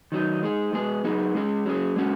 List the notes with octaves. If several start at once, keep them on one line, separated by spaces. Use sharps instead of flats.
D#3 F#3 D#4
G#3 D#4 G#4
G#3 B3 G#4
F#3 B3 D#4 G#4
G#3 C#4 G#4
F#3 C#4 G#4
G#3 C#4 F#4